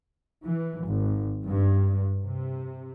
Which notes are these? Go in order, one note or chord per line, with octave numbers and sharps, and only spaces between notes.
E3
G#1
G2
C3